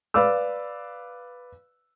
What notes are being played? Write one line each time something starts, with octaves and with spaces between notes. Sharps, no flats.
B4 D5 F5 D6 E6